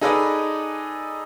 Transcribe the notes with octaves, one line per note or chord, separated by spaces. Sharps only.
D#4 G#4 A4 B4 D5 D#5